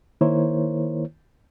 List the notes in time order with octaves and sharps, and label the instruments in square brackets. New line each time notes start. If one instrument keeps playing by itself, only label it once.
[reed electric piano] D#3 A#3 E4 A#4 C5 C#5